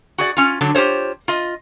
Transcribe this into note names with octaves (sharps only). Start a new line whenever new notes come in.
F#4 G#4 D5
C#4 F4
D3 F#3 D4
F4 G4 G#4 C5 C#5
F4 D#5